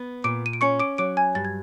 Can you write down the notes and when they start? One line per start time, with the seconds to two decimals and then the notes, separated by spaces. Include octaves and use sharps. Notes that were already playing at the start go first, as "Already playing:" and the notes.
Already playing: B3
0.24 A#2 D6 D7
0.46 D#7
0.53 D7
0.61 C#4 C#6 C#7
0.80 D6 D7
0.98 F#3 D6 D7
1.17 G#5 G#6
1.35 G2 A6
1.45 G#6